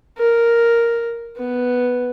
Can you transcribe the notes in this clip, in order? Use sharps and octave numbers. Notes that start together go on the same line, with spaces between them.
A#4
B3